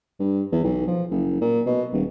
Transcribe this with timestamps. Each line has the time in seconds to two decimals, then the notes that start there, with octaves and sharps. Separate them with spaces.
0.20 G2
0.52 E2
0.64 B1
0.87 F3
1.11 F#1
1.41 A#2
1.66 B2
1.92 D#1